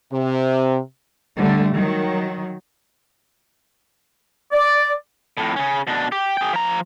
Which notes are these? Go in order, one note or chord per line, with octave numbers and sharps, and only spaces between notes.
C3
D3 G3 A3
D#3 F#3
D5
F2 A2
C#3 C#4
B2 D4
G4
G#4 G5
F3 A#5